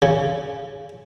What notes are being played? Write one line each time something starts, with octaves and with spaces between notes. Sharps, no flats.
C#3